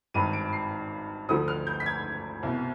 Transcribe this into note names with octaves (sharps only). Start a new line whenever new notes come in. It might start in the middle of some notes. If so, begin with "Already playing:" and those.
G#1 G2 D#3 D#7
D7
C7
D2 D3 F3 D#6
F6
G6
B6
G#6
C2 B2